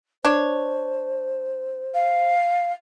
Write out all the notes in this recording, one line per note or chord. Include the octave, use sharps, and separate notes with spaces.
D4 C5 C#5
F5